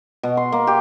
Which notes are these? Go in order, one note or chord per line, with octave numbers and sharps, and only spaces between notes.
B2
C6
A#3
G4